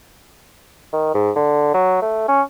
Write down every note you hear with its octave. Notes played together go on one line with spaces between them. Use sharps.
D#3
G#2
D3
F#3
A3
C#4